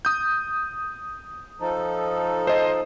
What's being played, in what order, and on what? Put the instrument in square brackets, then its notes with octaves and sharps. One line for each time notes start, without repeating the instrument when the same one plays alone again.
[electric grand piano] D#6 G6
[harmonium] F3 D#4 A4
[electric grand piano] C5 D#5